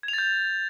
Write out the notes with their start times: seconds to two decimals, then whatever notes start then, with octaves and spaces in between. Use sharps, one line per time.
0.03 G#6
0.08 F7
0.13 A6
0.18 G6